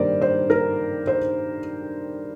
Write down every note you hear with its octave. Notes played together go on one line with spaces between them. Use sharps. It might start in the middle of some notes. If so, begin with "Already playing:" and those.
Already playing: G2 D#3 G3 A#3 A#4 C5 D5
C5
A#4
C5